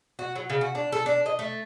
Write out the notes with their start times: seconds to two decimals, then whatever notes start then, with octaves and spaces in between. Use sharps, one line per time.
0.19 F#4
0.36 F#3
0.50 C#3
0.61 F#4
0.75 D4
0.92 A4
1.06 D4
1.26 D#5
1.39 A3